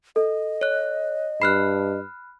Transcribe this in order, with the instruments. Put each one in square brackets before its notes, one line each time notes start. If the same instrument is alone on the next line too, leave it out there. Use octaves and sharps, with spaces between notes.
[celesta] A4 [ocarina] D#5
[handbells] C#5 F#6
[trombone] G2 [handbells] B5 F6 F#6 [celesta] C7